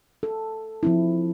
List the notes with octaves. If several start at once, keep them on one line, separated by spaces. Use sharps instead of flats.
A4
F3 C4 E4